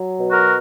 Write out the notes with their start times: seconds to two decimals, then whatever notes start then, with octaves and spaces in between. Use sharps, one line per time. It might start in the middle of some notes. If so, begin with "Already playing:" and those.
Already playing: F#3
0.19 B2
0.31 F#4 A#4